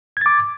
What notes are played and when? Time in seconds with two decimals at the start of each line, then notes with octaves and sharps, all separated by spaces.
0.17 G#6
0.21 A6
0.26 D6